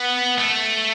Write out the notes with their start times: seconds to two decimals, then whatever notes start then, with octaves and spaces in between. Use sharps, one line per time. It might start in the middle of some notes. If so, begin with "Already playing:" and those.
Already playing: B3
0.38 A3